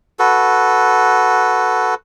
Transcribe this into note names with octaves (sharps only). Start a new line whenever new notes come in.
F#4 A4 B4